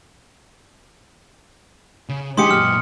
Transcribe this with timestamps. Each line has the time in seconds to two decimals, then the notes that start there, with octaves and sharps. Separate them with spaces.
2.09 C#3
2.37 G#3 E4 G4 G#5 C6 D#6 C#7
2.51 F#2 A#2 F6